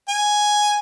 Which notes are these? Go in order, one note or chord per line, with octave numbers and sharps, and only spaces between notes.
G#5